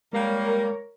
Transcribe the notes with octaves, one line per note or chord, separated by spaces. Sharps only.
G3 G#3 A#3 A#4 C#5